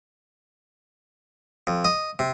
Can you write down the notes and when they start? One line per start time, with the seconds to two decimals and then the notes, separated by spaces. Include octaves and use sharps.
1.67 F2
1.85 D#5
2.19 C3